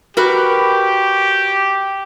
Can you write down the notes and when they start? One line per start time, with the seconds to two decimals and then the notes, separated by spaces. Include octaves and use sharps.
0.17 F#4 G4 A#4 B4